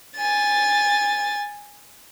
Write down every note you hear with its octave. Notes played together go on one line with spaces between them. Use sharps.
G#5 A6